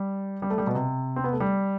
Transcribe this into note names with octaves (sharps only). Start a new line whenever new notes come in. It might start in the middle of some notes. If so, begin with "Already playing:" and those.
Already playing: G3
G3
A3
G3
B2
C3
C4
B3
A3
G3